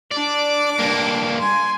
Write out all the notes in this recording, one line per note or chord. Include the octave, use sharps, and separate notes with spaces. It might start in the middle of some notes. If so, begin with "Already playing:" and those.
D4 D5 D6
G2 A#3
G#5 C6